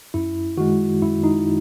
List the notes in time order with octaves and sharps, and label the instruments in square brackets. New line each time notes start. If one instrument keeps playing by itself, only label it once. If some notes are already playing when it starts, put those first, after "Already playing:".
[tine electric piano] F#2 E4
D#3 G#3 F#4
F#2 E4
D#4